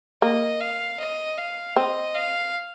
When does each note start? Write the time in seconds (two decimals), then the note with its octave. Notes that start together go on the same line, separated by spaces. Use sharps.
0.22 A#3 D#5
0.60 F5
1.00 D#5
1.38 F5
1.76 C4 D#5
2.15 F5